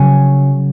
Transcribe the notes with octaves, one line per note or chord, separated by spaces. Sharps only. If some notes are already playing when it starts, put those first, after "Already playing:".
Already playing: C#3 F#3 C#4 G#5